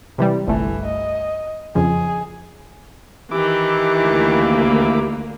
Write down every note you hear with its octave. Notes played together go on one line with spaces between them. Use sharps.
C3 E3 G3
G1 C2 E3 A3
D#5
F2 C#3 F3 G#4
D#3 E3 E4 G4 D6
D2 A#3